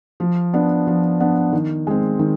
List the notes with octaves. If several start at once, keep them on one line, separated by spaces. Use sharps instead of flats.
F3
B3 D4
F3
B3 D4
D#3
G#3 C4
D#3